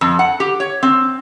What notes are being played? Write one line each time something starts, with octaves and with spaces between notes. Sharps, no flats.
F2
F#5
G4
C#5
C4